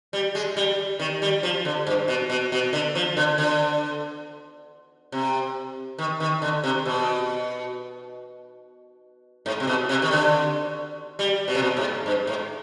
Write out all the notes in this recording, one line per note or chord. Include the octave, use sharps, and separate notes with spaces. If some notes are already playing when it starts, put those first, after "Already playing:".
G3
G#3
G3
D#3
G3
F3
D3
G2
B2
B2
B2
D3
F3
D3
D3
C3
D#3
D#3
D3
C3
B2
G#2
C3
B2
C3
D#3
D3
G3
B2
C3
B2
G#2
G2
G#2